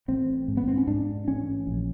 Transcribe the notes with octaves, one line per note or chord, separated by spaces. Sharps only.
A1 C4
G#2
B3
C4
C#4
G#2 D4
A1 C#4
A#1